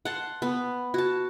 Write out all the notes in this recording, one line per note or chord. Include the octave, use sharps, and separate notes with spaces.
F#5 A5 C6
B3
F#4 A5